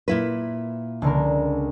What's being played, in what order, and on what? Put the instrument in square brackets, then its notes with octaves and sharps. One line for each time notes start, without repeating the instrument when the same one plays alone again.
[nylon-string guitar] A#2 E4 B4
[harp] C#2 D3 A#4